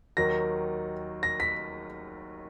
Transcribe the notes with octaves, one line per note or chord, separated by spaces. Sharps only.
D#2 D#3 F#3 A#6
A#6
B6